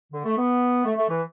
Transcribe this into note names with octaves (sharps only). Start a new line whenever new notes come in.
D3
A3
B3
A3
A3
E3